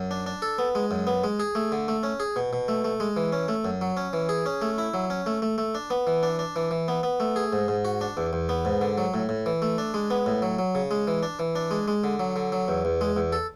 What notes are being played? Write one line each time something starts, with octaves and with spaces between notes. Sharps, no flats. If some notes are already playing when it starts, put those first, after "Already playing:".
Already playing: F#2
D4
D4
A4
B3
G#3
F#2
B3
G#3
G#4
A3
D3
A3
C#4
G#4
B2
B2
A3
A3
G#3
E3
C#4
A3
F#2
F#3
C#4
E3
G#4
C#4
A3
E4
F#3
C#4
A3
A3
A3
D4
B3
E3
D4
D4
E3
E3
B3
B3
A3
G#4
G#2
G#2
F#4
D4
E2
E2
B3
G#2
D3
F#3
A2
A2
E3
A3
D4
G#3
B3
A2
F#3
F#3
C#3
G#3
E3
D4
E3
D4
G#3
G#3
D3
F#3
D3
F#3
E2
E2
G#3
E2
A4